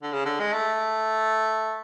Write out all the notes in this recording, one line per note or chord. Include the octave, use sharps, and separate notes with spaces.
D3
C#3
D3
G#3
A3